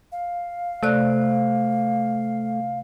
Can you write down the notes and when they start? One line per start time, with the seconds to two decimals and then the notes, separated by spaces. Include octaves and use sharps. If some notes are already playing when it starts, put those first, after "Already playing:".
0.12 F5
0.83 C3 A3 D5 F#6